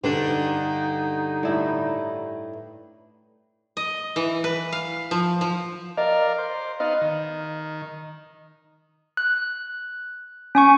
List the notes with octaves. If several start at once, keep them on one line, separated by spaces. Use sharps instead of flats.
G2 D3 D4 D#4
A2 G3 E4
D#5
E3
B4
F5
F3
F3
A#4 D5 D#5 F5
C5
B3 D#4 D#5 F5
D#3
F#6
C#4 G#5 C#6